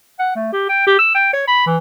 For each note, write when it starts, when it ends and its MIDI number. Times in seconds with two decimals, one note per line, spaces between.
0.19 0.31 78
0.35 0.51 57
0.53 0.64 67
0.69 0.82 79
0.87 0.98 67
0.99 1.12 88
1.15 1.31 79
1.33 1.46 73
1.47 1.64 83
1.66 1.77 52